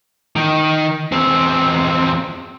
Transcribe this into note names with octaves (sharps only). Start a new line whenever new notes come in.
D#3
E2 C4